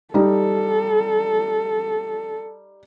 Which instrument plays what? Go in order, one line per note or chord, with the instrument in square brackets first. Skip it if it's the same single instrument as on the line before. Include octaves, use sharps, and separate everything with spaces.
[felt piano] G3 D#4 [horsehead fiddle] A4